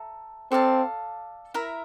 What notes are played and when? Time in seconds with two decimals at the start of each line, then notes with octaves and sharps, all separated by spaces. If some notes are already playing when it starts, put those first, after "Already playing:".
Already playing: A4 E5 A#5
0.51 C4 A4 D5 F5 A5
1.54 E4 A#4 E5 A#5